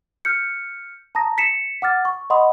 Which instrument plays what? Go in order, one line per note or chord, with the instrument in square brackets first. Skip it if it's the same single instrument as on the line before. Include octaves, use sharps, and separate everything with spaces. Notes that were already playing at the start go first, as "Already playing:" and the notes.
[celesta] F6 G6 C#7
A5 A#5 D#6 A#6
B6 C#7 E7
F#5 D6 F6 A6
C#6
D#5 F#5 B5 C6 D#6